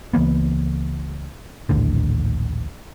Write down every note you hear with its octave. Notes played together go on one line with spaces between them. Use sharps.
C#2 E3 A#3 B3
A#1 D#2 A2 D3